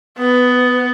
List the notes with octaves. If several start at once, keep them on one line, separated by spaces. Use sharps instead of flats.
B3 B4